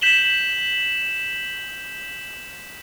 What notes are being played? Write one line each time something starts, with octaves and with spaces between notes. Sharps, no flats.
G6 B6 E7 F#7 G7